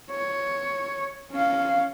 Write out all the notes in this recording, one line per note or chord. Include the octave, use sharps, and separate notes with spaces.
C#5
C#4 F5